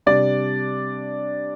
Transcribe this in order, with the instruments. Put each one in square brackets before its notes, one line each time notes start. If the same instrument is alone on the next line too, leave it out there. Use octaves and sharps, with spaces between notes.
[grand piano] C3 G3 D4 D5